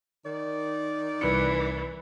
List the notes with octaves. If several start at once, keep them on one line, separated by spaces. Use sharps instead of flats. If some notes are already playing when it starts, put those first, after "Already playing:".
D#3 D5
C2 E3 C#7